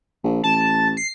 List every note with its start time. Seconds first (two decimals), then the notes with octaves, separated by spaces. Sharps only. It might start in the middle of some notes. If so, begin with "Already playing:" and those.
0.24 A#1
0.43 A1 A5
0.97 C7